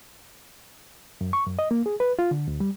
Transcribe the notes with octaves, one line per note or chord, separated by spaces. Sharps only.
F#2
C#6
F#2
D#5
A#3
G#4
B4
F4
D3
D2
G3